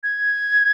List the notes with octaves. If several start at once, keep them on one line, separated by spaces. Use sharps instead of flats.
G#6